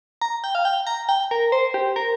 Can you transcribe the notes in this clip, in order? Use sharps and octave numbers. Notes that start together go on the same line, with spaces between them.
A#5
G5
F5
G5
A#5
G5
A#4
C5
G4
A#4